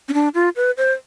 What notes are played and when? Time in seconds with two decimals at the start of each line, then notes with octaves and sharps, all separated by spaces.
0.09 C#4
0.14 D4
0.34 F4
0.56 B4
0.77 C5